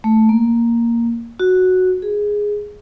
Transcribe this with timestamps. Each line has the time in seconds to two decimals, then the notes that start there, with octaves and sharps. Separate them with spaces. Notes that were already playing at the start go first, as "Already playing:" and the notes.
0.04 A3
0.29 A#3
1.40 F#4
2.02 G#4